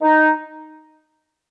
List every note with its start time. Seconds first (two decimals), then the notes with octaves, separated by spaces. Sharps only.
0.01 D#4